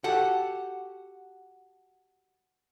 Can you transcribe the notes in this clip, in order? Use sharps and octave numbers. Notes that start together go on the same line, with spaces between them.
F#4 G4 A4 F#5